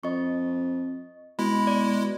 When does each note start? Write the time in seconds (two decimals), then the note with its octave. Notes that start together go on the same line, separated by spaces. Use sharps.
0.03 F2 D#5 C#6
1.39 B2 G#3 E4 B5
1.67 D5